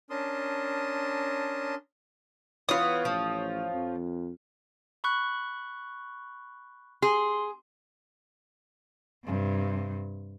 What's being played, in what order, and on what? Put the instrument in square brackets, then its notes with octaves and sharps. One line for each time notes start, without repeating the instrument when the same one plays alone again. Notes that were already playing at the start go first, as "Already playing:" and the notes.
[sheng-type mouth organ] C#4 D4 A#4 A5 C6 D#6
[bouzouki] E3 B3 [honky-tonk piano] F4 C#5 [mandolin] D#6
[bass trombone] A1 [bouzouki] F3
[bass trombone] F2
[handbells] B5 C#6 F#6
[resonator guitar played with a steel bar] G#4 [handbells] C6
[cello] G2 C3